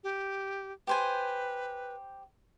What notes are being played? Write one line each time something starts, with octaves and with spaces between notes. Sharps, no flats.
G4
G4 B4 C5 G#5